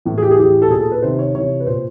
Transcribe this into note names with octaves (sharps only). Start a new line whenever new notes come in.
A2 E3
G#4
G4
G#4
A2 E3 G4
A4
A#2 G#4
A4
B4
C3 D#3 C5
C#5
C3 E3 C#5
B4
A#2 C5